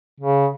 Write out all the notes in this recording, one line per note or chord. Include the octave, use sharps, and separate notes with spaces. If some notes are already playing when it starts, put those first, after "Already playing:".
C#3